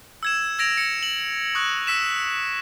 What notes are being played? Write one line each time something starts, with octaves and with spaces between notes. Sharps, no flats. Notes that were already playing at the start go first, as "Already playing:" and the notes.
E6 G#6 E7
E6 G#6 A#6 D7 F7
C#7
F#7
C#6 D#6 F#6
E6 B6 E7